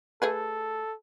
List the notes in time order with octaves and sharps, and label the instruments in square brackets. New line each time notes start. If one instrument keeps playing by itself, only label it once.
[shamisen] A3 G#4 B4 [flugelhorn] A4